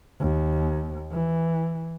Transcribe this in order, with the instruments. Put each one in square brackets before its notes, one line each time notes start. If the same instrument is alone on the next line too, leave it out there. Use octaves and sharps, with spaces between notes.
[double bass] D#2
E3